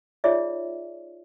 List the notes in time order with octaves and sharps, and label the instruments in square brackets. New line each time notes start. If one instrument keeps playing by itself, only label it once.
[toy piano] D#4 F4 G#4 C#5 D5 E5